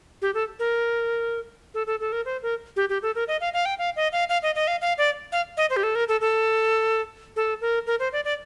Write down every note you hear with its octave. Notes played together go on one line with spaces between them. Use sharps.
G4
A4
A#4
A4
A4
A4
A#4
C5
A#4
G4
G4
A4
A#4
D#5
F5
F5
G5
F5
D#5
F5
F5
D#5
D#5
F5
F5
D5
F5
D#5
C5
G4
A4
A#4
A4
A4
A4
A#4
A#4
C5
D5
D5